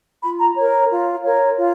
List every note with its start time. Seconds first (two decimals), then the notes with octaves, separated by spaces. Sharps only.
0.23 F4 B5
0.40 A#5
0.57 A#4 C#5
0.90 F4
1.23 A#4 C#5
1.57 F4